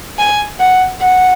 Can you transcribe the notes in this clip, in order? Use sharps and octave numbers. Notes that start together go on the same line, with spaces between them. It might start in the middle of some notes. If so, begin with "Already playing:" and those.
G#5
F#5
F#5